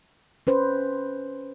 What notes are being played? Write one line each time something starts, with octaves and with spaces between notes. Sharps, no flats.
C#4 B4 C5